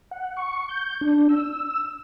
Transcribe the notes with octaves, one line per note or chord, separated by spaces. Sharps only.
F#5
C#6
G6
D4
E6